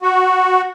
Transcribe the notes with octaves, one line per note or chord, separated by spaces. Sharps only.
F#4